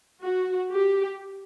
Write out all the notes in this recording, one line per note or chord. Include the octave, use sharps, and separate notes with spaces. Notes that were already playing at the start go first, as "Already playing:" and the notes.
F#4
G4